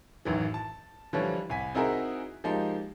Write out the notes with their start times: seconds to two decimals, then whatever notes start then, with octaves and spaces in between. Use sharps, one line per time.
0.25 A1 F#2 D#3 E3
0.54 A5
1.13 D3 E3 F3 G3 F4 C#5
1.50 C2 G#5 B6
1.75 C4 D#4 E4 F#4 G#4 A#4
2.44 F3 G#3 A#3 D#4 G4